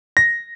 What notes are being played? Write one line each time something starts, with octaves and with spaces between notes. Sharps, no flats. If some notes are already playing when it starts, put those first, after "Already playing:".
A#6